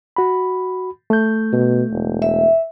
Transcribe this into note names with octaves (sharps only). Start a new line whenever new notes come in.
F#4 B5
A3 G6
B2
E1
E5